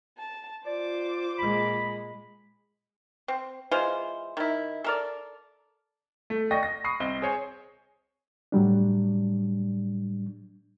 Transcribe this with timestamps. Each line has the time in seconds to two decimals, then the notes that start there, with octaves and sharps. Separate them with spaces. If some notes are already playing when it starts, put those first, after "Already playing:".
0.17 A5
0.66 F4 C5 D5 D6
1.39 A#2 G#3 B5
3.28 C4
3.71 E3 G#3 F4 C5
4.37 D#3 E4
4.84 A4 A#4 D5
6.30 A3
6.51 D5 D#5 G5 C#6 A#6
6.63 A#6
6.84 B5 C#6 D#6 C7
7.00 C2 C4 D#5 G7
7.22 G#4 C5 C#5 G#5
8.52 A2 F#3 G3 D4